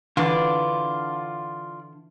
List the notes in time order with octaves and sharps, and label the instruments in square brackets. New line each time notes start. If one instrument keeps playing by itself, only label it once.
[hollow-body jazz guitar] D3 [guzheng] E3 [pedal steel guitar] F4 D5